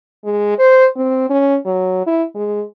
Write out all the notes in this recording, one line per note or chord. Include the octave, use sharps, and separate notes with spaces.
G#3
C5
C4
C#4
F#3
E4
G#3